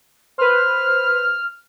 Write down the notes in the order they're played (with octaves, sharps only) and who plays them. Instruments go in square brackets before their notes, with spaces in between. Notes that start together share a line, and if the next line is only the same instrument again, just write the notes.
[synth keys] B4 C5 [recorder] F6